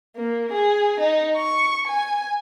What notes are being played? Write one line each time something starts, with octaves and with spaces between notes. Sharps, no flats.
A#3
G#4
D#4
C#6
G#5